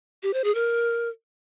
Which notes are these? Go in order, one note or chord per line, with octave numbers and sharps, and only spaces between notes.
G4
C5
G#4
A#4